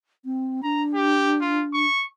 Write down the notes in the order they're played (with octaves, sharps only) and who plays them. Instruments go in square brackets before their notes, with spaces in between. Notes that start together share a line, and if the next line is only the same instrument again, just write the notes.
[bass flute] C4
[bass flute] D4 [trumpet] A#5
[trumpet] G4
F4
C#6